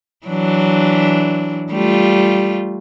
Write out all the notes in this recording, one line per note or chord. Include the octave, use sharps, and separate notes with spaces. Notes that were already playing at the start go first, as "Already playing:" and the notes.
E3 F#3 D4
G3 A3 F4